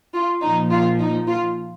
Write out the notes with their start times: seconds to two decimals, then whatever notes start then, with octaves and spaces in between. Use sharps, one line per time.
0.15 F4
0.43 A#2 F3 D#4
0.71 F4
1.01 D#4
1.28 F4